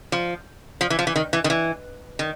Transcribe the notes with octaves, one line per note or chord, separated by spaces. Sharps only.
F3
F3
E3
F3
E3
D#3
E3
D#3
E3
D#3